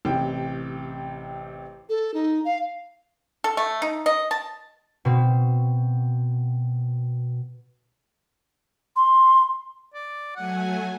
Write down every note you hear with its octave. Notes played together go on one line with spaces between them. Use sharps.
A1 C3 G5
A4
D#4
F5
A4
A3
D#4
D#5
A5
B2 C4
C6
D5
F#3 A3 F#5 G#5